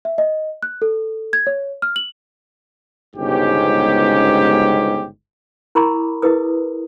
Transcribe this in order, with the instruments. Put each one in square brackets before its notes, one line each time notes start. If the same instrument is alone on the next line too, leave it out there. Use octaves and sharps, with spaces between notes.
[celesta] E5
D#5
F#6
A4
G#6
C#5
F6
F#7
[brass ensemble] G1 C#2 G#2 B2 C#4 G4
[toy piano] E4 A#4 A#5 B5 C#6 D6
E4 G#4 A#4 B4 D#6